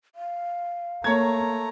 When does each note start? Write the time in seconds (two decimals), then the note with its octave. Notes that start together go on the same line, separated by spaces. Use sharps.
0.15 F5
1.04 A3 A#3 C#5 A#5 G#6